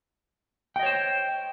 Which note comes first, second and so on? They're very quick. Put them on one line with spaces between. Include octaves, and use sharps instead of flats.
G5 D#5 C#5 C5